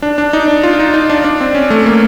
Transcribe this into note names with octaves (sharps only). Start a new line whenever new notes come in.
D4
D4
D#4
D4
F4
D#4
D#4
D4
D4
C4
C#4
A3
A#3